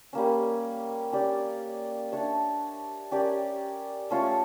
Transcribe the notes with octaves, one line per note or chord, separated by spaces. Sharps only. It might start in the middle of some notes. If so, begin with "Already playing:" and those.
G3 A#3 C#4
C#4 G4 D5
D4 A4 C#5 E5
C#4 G4 A#4 D5
A3 C#4 F4 C#5